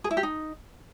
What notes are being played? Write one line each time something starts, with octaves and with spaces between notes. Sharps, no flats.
G#4
E4
G4
D#4